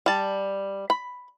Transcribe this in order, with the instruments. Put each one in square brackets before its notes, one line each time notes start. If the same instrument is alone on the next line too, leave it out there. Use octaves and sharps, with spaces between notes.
[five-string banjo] G3 A5
B5